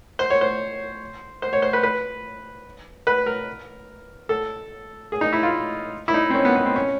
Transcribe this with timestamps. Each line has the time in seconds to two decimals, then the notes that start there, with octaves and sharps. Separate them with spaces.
0.19 C5
0.30 C#5
0.41 C5
1.42 C5
1.53 C#5
1.62 C5
1.73 B4
1.83 B4
3.07 B4
3.26 A#4
4.29 A4
5.12 G#4
5.21 D#4
5.33 E4
5.43 F4
6.08 E4
6.14 D#4
6.30 C4
6.35 C#4
6.45 B3
6.56 B3
6.65 C4
6.76 C#4